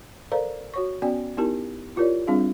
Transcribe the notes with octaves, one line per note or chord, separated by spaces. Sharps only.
A4 A#4 C5 D5 F5 A#5
F#4 C#5 C#6
B3 C#4 F#4 D5 G5 G#5
B3 D#4 E4 G4 A#4 A5
E4 F4 G4 A#4 C#5 D5
G3 C4 D4 F4 G#4 F5